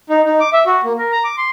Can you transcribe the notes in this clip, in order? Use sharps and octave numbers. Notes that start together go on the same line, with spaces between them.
D#4
D#4
D6
E5
F#4
A#3
A#4
A#5
D6
C6